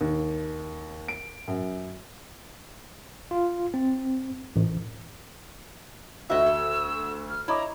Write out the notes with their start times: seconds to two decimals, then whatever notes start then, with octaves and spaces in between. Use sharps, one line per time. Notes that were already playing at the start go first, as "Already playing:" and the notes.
0.01 D#2
1.08 D7
1.48 F#2
3.31 F4
3.74 C4
4.56 A1
6.30 D2 F#4 D#5 E5 E6
6.46 A4
7.29 F6
7.48 E4 C#5 D#5 A#5 D6